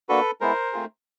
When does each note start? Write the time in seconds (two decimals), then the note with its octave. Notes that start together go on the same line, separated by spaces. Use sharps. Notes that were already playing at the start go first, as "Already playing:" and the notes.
0.09 A#3 D4 F#4 A4 B4
0.41 G#3 B3 E4 A#4 C5
0.72 A3 C4 F4 G#4